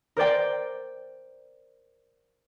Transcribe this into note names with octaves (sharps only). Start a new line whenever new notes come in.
A#4 C5 D5 G5